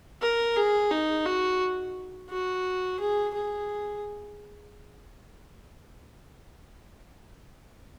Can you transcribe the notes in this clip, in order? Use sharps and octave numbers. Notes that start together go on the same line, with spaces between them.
A#4
G#4
D#4
F#4
F#4
G#4
G#4